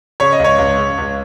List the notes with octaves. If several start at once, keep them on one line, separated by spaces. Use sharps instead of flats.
C#3 C#5
D#5
C#2
C#5
C#2
C#3
C#2